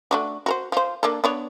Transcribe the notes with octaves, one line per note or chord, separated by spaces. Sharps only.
A3 D4 F#4
F#4 A#4 C5
F3 C5
A#3 D4 A4
B3 D4 C#5